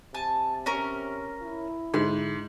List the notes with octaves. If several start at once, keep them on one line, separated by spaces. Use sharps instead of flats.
C3 G#5 A5
C#4 A#4
E4
G#2 D3 C6